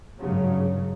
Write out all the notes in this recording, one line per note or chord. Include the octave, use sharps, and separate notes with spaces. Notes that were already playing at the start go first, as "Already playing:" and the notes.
G#1 G2 C#3 F#3